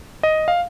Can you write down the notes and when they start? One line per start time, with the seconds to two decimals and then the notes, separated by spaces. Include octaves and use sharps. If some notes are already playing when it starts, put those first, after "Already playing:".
0.23 D#5
0.48 F5